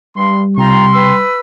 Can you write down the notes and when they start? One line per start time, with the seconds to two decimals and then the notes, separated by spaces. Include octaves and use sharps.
0.16 G2 G3 C6
0.58 C3 D#4 F4 G5 A#5 C6
0.93 B4 E6